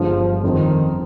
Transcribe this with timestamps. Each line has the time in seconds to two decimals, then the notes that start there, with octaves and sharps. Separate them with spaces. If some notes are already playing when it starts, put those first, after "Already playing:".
Already playing: G1 G2 D3 F3 G#3
0.43 F2 D3 D#3 F3 C4